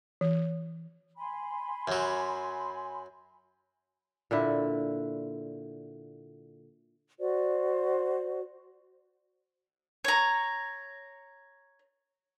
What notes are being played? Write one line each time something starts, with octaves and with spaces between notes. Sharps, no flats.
E3
G#5 B5 C6
F#2 F#3
A#2 D3 E4
F#4 C5 D5
C#5 A#5